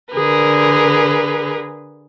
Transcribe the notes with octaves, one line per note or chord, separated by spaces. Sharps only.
D3 G#4 A#4 B4